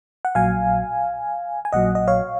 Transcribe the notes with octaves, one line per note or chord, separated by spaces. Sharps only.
F#5
A#1 A#2 F#3 F5 G#5
G#5
A#1 A#2 F#3 D#5 F#5
D#5
C#5 F5